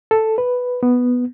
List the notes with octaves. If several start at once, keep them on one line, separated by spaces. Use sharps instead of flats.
A4
B4
B3